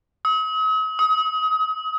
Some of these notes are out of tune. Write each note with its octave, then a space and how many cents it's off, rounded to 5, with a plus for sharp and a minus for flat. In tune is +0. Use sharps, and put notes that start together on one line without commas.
D#6 +45
D#6 +30